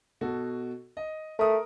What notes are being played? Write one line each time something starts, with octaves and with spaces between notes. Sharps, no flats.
B2 F#4 A4
D#5
A3 A#4 D#6